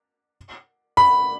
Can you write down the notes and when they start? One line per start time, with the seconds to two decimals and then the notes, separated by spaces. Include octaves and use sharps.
0.97 B5